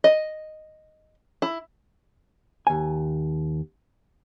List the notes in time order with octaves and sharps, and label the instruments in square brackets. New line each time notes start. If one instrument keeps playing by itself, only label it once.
[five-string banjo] D#5
E4
[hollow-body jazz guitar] D#2 G#5